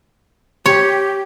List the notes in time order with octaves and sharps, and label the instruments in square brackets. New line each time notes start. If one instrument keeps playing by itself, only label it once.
[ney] G4 [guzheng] C#5